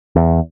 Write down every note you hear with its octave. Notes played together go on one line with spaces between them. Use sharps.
E2